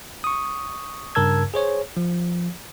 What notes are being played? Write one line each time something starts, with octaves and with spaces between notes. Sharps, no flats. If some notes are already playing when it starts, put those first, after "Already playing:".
C#6 D#6
G2 C#3 A#4 A5 E6 G#6
G#4 C5 C#5
F3